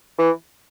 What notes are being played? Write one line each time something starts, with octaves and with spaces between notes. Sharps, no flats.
E3